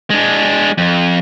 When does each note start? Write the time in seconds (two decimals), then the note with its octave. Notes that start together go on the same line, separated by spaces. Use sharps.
0.10 G#3 D4
0.78 F2